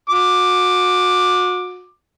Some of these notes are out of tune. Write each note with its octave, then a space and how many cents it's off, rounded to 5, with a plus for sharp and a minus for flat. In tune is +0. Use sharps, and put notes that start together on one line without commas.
F#4 -35 D6 +10